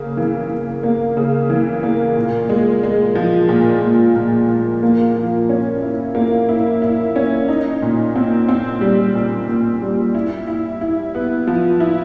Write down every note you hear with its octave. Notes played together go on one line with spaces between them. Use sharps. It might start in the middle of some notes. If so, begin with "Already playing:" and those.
Already playing: C#3 A#3
E3
E3
A#3
C#3
E3
A#3
A#2
G#3
G#3
F3
A#2
A#2
A#2
A#2
A#3
F3
C#4
E4
A#3
E4
E4
C#4
D#4
A#2
C4
C4
G3
A#2
A#2
G3
E4
E4
E4
B3
F3
E4